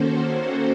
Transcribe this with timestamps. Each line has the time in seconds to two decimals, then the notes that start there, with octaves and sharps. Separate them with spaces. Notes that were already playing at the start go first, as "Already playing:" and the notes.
Already playing: D#3 A#3 C#4 F#4 A4 C5
0.23 A4